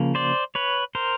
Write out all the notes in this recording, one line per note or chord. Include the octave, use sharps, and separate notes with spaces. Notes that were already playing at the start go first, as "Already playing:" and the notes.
Already playing: C#3 F3 A#3
C5 D5
B4 C#5
A#4 C5